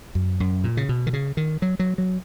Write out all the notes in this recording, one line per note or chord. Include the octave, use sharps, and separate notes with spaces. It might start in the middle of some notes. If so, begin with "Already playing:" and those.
F#2
F#2
A#2
C#3
B2
D#3
C#3
D#3
F#3
F#3
F#3